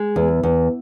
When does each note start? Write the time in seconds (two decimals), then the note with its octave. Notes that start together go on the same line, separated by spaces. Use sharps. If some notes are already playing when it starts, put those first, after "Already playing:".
Already playing: G#3
0.16 E2
0.43 E2